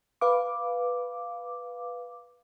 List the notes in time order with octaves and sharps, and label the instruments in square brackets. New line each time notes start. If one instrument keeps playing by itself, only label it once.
[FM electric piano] B4 F5 D6